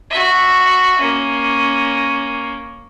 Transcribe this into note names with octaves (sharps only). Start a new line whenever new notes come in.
F#4 E5
A#3 C#4